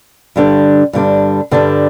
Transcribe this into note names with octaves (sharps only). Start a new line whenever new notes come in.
G2 D3 G3 D4
G2 D3 G3 D4
G2 D3 G3 D4